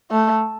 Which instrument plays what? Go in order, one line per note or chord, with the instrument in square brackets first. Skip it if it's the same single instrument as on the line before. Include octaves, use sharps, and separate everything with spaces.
[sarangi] A3